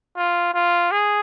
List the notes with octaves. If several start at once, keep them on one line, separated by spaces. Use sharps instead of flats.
F4
F4
G#4